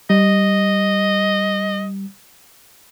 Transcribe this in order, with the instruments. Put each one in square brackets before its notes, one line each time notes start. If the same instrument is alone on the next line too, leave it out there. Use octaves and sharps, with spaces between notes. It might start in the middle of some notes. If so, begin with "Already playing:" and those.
[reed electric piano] G3 [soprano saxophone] D#5